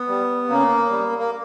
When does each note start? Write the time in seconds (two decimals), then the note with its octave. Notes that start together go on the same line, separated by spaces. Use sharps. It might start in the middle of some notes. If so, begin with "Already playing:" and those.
Already playing: B3
0.08 G3
0.49 C#3 A#3
0.89 G3
1.18 A#3